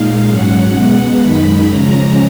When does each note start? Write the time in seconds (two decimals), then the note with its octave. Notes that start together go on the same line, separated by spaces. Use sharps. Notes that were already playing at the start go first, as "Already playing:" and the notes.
Already playing: A#2 G#3 D#4 F5
0.27 G#2 F#3 C#4 F#5
0.74 B2 G#3 B3 F#5
1.20 F#2 D#3 G#3 D#4 B5
1.66 C#3 F3 G#3 C#4 A#5